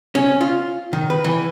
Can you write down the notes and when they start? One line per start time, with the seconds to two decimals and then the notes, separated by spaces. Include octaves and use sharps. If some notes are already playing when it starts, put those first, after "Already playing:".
0.15 C#4
0.41 F4
0.93 D#3
1.10 B4
1.24 E3